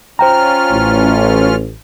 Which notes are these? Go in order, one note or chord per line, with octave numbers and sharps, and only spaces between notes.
C#4 F4 C5 G5 A#5 F6
A1